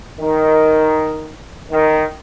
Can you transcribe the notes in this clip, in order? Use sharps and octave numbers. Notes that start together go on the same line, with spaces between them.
D#3
D#3